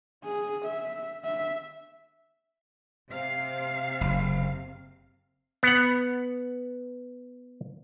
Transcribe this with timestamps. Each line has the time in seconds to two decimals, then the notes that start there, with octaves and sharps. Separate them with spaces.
0.24 G#4
0.66 E5
1.25 E5
3.10 C3 F5
4.01 F#1
5.63 B3 F#5